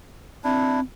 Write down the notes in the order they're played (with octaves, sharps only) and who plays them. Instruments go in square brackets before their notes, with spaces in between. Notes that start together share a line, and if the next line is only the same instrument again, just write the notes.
[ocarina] C4 [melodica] D4 E4